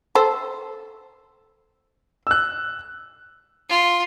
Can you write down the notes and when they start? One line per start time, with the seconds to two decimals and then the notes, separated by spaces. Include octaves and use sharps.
0.15 A4 C5
2.27 E6 F#6
3.70 F4